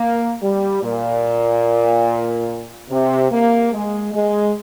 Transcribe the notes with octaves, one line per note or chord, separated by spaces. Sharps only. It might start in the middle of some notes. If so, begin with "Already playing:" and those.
Already playing: A#3
G3
A#2
C3
A#3
G#3
G#3